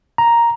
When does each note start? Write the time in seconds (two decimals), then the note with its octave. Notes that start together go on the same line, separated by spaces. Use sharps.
0.18 A#5